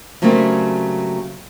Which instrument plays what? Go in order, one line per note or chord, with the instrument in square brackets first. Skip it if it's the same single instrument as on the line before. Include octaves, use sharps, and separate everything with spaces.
[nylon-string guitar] C#3 F#3 G3 A3 A#3 C4